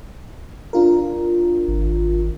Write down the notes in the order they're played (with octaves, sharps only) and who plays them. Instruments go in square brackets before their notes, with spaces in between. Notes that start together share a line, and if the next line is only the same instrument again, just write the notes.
[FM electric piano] D4 F4 A#4
[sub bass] G#1